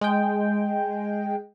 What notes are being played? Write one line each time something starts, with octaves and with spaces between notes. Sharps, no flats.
G#3 G5